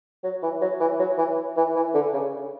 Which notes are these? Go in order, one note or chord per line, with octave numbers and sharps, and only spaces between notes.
F#3
E3
F#3
E3
F#3
E3
E3
E3
D3
C#3